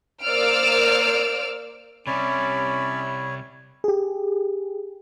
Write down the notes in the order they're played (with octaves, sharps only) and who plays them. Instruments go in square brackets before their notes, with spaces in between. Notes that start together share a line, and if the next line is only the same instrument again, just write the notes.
[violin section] A#3 C5 D5 E6 F6 D7
[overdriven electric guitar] C3 G3 [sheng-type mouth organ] C#4 D5 [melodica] C#5 [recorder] B5
[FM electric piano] G4 G#4